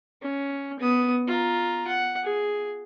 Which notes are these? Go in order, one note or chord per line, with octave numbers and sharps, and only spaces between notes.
C#4
B3 D#6
F4 A#5
F#5
G#4